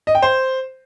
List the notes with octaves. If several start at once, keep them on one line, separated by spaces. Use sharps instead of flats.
D#5
G5
C5